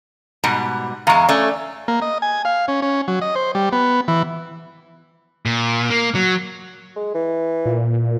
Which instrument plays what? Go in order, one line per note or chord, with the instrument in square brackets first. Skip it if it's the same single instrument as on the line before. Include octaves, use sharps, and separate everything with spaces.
[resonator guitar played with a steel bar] G#2 B2 G3
[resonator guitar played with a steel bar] E2 G#3 [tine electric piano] F5 A#5 C#6
[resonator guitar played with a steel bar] A3 C#4 [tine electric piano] D5
[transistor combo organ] A#3
D#5
G#5
F5
C#4
C#4
F#3
D#5
C5
G3
B3
E3
[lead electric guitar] A#2
A#3
F#3
[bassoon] G#3
E3
[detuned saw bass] A#2